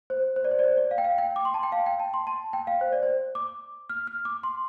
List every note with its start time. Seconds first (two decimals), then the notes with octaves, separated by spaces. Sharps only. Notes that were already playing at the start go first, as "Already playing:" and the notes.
0.10 C5
0.36 C5
0.45 D5
0.51 C5
0.59 D5
0.64 C5
0.77 D5
0.91 F5
0.98 G5
1.04 F5
1.18 G5
1.36 D6
1.45 C6
1.54 A5
1.63 G5
1.72 F5
1.86 G5
2.00 A5
2.14 C6
2.27 A5
2.53 G5
2.67 F5
2.81 C5
2.93 D5
3.03 C5
3.35 D6
3.90 F6
4.07 F6
4.25 D6
4.43 C6